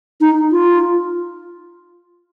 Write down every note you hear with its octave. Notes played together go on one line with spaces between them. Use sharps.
D#4
F4